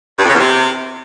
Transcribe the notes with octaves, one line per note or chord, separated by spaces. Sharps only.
G2
F2
C#3
E2
C3